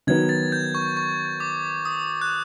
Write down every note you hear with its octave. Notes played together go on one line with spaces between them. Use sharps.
D#3 F#3 B3 G#6
A6
G6
C#6
C#6
D6
D#6
F#6